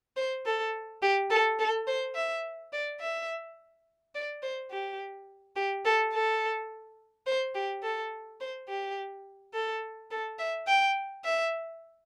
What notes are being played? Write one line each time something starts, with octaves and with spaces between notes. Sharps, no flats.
C5
A4
G4
A4
A4
C5
E5
D5
E5
D5
C5
G4
G4
A4
A4
C5
G4
A4
C5
G4
A4
A4
E5
G5
E5